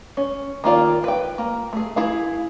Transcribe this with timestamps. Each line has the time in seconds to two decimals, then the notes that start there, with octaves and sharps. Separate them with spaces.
0.17 C#4
0.64 D#3 A#3 F4 D5
1.04 B4 G5
1.38 A#3
1.73 A3 G#4
1.96 E4 G#4 F5